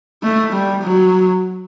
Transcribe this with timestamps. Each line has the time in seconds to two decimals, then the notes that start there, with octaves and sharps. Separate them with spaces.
0.23 A3
0.53 G3
0.84 F#3